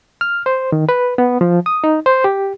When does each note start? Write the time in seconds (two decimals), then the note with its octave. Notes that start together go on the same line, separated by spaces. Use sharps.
0.21 F6
0.46 C5
0.72 D#3
0.89 B4
1.18 B3
1.41 F3
1.66 D#6
1.84 D#4
2.06 C5
2.24 G4